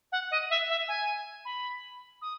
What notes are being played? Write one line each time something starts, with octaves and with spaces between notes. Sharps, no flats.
F#5
D#5
E5
E5
G#5
B5
D#6